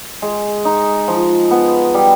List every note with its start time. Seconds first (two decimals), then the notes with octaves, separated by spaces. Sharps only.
0.22 G#3
0.65 D#4
1.08 F3
1.51 B3
1.94 G3